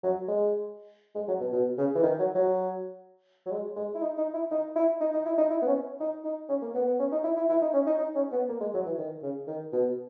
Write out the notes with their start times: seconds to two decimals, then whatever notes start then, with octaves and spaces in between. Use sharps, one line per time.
0.03 F#3
0.28 G#3
1.15 G#3
1.28 F#3
1.40 B2
1.52 B2
1.77 C#3
1.95 E3
2.03 D#3
2.19 F#3
2.35 F#3
3.46 F#3
3.51 G#3
3.76 G#3
3.94 E4
4.01 D#4
4.17 D#4
4.33 E4
4.51 D#4
4.75 E4
5.00 D#4
5.13 D#4
5.25 E4
5.37 D#4
5.50 E4
5.62 B3
5.67 C#4
6.00 D#4
6.24 D#4
6.49 C#4
6.62 A#3
6.74 B3
6.86 B3
6.99 C#4
7.12 D#4
7.24 E4
7.36 E4
7.49 E4
7.61 D#4
7.73 C#4
7.86 D#4
7.98 D#4
8.15 C#4
8.32 B3
8.49 A#3
8.60 G#3
8.74 F#3
8.85 E3
8.98 D#3
9.22 C#3
9.47 D#3
9.72 B2